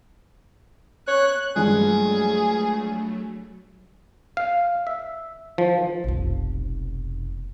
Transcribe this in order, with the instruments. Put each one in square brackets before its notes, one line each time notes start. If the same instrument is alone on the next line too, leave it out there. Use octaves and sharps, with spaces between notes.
[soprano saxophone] C#5 [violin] F#6
[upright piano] G2 F3 [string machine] F#3 A3 [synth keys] G#3 [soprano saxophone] G#4
[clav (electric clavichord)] F5
E5
F3
[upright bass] F1 B1